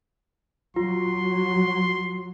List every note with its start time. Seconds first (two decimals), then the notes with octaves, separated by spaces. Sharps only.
0.76 F#3 F4 C6